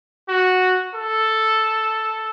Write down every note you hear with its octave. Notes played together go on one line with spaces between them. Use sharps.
F#4
A4